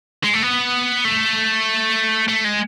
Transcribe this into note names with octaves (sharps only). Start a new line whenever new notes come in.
G#3
A3
B3
A3
A3
G#3